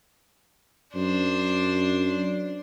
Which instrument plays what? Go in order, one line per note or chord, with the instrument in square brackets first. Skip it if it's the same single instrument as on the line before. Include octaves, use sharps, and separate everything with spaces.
[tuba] F#2 [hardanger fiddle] D4 C5